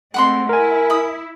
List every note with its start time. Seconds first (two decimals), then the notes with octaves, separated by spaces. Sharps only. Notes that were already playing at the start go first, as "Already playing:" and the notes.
0.14 G#3 A3 C4 F#5 B5 C6
0.49 E4 A#4 G#5
0.90 B5 D#6